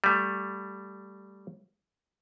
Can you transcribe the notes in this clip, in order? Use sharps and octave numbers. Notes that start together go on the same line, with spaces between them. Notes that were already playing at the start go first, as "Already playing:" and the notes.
G3 A3